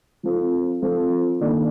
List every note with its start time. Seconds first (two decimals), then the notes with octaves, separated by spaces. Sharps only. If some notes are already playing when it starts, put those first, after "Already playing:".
0.23 F3 C4 F4 A4
0.82 F3 C4 F4 A4
1.40 D#3 A#3 D4 A4 D5